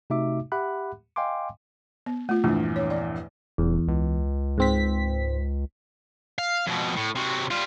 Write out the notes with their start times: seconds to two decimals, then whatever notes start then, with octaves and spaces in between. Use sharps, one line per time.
0.10 C3 A3 D#4 F#4 E5 D6
0.52 G4 E5 F#5 B5 D6 F#6
1.16 D#5 F5 G5 G#5 C6 D6
2.06 B3
2.29 A3 F4
2.44 A#1 E2 G2 A3
2.76 C#5
2.90 D5
3.58 D#1 E2
3.88 C#2
4.58 G#2 C4 B6
6.38 F5
6.67 F2 B2
6.96 A2
7.15 C3 F#3
7.51 G3 F4